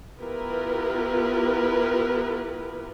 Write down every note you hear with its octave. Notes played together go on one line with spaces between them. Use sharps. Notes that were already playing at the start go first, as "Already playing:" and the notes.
B3 E4 F4 G4 A#4 B4